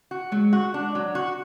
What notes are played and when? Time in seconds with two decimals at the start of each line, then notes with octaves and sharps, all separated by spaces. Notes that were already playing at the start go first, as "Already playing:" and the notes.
0.11 F#4
0.32 F#3 G#3
0.53 F#4
0.74 D4
0.95 F#3
1.15 F#4